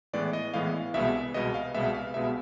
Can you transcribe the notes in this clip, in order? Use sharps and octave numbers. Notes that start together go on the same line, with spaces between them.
A2 E3 G#3 B3 D5
D#5
A2 E3 G#3 B3 F5
C2 B2 G#3 B3 E5
C2 B2 G#3 B3 D#5
F5
C2 B2 G#3 B3 E5
F5
C2 B2 G#3 B3 E5